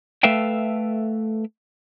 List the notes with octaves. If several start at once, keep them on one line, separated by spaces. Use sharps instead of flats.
A3 A4 B4 E5 F5 G5